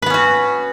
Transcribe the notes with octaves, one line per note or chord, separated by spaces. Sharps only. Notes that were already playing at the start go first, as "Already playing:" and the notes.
B3 C#4 F#4 B4